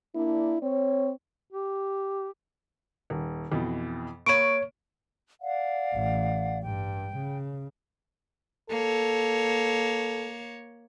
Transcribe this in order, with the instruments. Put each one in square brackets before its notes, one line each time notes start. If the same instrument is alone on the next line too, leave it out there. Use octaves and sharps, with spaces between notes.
[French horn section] A#3 D4 [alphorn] E4
[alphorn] C4 [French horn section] C#5
[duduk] G4
[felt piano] D#1
F2 B2 E3
[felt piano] A#3 B5 D#7 [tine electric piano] C#5 C#6 [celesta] D7
[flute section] D5 F5 F#5
[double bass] A1
[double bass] G2 [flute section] G5
[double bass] C#3
[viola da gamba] A#3 C#5 [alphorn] A4